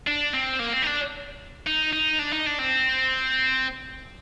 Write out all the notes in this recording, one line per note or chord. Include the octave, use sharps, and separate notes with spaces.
D4
C4
A#3
C4
D#4
D4
D#4
D#4
D4
D#4
D4
C4